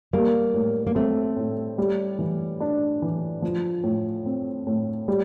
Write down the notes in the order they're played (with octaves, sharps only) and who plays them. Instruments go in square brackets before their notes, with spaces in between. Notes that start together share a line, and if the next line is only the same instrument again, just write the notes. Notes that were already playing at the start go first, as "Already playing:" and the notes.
[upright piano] G3 [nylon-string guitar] A#3
[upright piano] A2
[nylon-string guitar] A#3
[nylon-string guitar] A3 [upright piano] C4
[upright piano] A2
G3
E3
D4
E3
F3
A2
C4
A2
G3